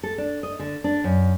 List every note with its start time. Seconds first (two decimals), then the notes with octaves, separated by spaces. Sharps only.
0.03 A4
0.18 D4
0.43 D#5
0.59 D3
0.84 D4
1.04 F#2